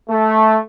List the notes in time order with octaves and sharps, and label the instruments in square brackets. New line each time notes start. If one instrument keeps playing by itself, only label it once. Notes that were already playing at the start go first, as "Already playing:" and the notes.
[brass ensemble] A3